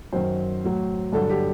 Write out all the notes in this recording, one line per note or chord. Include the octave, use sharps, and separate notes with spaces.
F#2 D#3 F#3 C5
A2 F#3
G2 D3 F#3 A4
G4